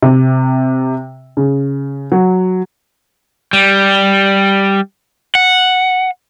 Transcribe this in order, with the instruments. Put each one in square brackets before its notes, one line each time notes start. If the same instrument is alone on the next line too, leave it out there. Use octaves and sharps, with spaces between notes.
[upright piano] C3
C#3
F#3
[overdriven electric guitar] G3
F#5